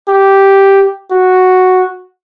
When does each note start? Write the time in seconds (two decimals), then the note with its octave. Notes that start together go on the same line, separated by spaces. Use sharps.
0.09 G4
1.11 F#4